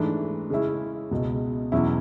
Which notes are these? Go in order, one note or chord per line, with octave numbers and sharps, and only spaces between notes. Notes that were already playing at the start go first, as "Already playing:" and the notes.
Already playing: G#2 E3 A3 D4
C#3 G#3 C#4 E4
C#2 B2 G#3
E2 B2 F#3 C#4 E4